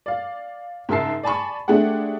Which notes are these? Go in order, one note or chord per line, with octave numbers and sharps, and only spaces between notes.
D5 F5
G#2 C#3 A#4 E5 A5 C7
D5 G#5 A5 B5 C#6
G#3 A3 D4 G4 G#4 F#5